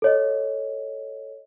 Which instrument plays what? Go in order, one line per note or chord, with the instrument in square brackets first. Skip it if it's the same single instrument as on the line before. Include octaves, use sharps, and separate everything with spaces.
[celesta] A4 C#5 D#5